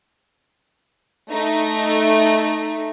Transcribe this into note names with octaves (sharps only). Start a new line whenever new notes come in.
A3 D#4